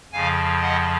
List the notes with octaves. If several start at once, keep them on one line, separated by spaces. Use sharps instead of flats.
F2 C#3 F3 F5 G#5
D#5 F#5